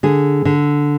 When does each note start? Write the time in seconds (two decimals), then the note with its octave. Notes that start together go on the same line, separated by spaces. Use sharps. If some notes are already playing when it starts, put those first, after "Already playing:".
0.03 D3 G#4
0.45 D3